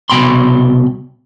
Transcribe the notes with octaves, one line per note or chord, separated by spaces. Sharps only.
C2 B2 G5 B5 C6